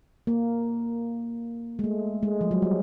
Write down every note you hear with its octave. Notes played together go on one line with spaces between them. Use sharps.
A#3
G#3
A3
G#3
F3
F#3
G3